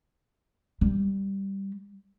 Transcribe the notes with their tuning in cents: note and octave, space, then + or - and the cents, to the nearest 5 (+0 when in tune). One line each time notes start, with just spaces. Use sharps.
G3 +0